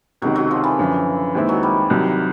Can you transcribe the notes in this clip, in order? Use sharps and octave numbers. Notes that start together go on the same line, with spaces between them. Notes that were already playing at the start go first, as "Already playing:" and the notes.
C#2 C3 D#3 F#3
F#3
F3
E3
F#2 D3 F3
D#2 D#3 G#3 C4 E4
F#3
G3
C2 C3 D#3 F#3